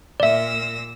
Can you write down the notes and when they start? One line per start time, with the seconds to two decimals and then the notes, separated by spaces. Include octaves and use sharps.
0.20 A#2 D5 E5 E6 A#6